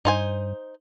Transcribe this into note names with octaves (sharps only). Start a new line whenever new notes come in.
G2 D#4 C5 G#5